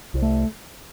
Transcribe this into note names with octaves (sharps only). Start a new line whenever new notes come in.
C2
A3